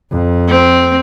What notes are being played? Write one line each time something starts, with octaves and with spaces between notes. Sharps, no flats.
F2
C4